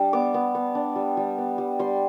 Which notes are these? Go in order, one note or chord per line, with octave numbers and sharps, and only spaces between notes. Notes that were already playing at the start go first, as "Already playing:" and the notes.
Already playing: G3 D4
B3 D6
B3
B3
D4
G3
G3
B3
G3
G3 C6